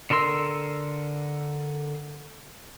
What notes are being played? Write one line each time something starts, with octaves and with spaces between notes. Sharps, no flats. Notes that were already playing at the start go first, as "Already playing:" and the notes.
D3 A4 A#4 C6 E6